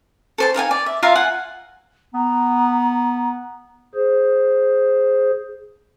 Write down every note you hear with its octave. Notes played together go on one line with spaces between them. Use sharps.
A4 C5 A5
D#4 F5 G5 G#5
D5
E5
F4 E5 F5 A#5
F#5 G#5
B3 A#5
G#4 C5